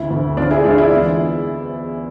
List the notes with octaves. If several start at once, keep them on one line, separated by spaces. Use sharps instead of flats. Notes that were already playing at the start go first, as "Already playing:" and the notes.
Already playing: D2 E4
D2
D2 D4 F4
E4 G#4
G#3 D4 F4
E4
E2